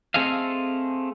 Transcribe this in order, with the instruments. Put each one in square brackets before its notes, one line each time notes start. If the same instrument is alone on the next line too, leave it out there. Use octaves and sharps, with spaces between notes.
[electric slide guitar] A3 C4 G#4 A4 D#5 F5